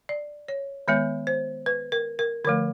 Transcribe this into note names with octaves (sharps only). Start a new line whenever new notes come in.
D5
C#5
D#3 G#3 B3 C#5
C5
B4
A#4
A#4
D3 F3 A3 A#4